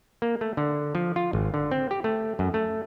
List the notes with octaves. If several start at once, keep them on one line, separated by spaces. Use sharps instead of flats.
A#3
A3
D3
F3
F4
G#1
D3
C4
G4
A3
F#2
A3